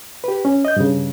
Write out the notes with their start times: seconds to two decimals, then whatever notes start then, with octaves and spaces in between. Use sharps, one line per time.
0.24 G4 B4
0.45 C#4
0.65 D#5 G6
0.76 G2 C#3